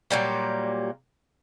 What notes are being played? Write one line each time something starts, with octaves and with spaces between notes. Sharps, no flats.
A#2 F#3 G3 A#3